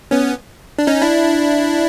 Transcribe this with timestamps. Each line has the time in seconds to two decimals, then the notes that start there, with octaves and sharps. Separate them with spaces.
0.11 B3 C#4
0.78 D4
0.87 C#4 D#4
1.01 D4 E4